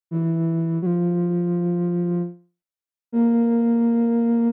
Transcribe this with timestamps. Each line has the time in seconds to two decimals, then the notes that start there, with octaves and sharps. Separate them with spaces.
0.11 E3
0.82 F#3
0.86 F3
3.12 A#3